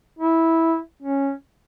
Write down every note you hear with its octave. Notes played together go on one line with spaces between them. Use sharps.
E4
C#4